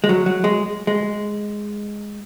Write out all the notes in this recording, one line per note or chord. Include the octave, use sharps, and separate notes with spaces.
G#3
F#3
F#3
G#3
G#3